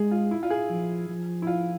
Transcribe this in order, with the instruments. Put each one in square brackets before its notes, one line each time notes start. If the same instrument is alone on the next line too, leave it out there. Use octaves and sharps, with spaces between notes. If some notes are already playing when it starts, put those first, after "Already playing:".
Already playing: [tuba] G#3 [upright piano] G#4
[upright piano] F4
E4
F4
G#4
[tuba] F3
F3
[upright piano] E4
F4